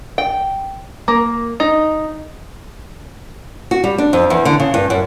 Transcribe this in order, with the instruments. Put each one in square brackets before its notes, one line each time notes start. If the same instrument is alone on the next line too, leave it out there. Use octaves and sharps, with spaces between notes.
[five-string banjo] G5
A#3
D#4
[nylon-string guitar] F#4
G3
D4
F2
E2
D3
C#3
G2
F#2